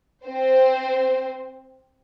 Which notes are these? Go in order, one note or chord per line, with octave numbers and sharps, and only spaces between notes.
C4 C5